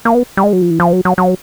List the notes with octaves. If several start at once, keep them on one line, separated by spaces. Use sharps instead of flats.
A#3
B3
G3
G#3
F#3
F3
E3
F3
F#3
F#3
F#3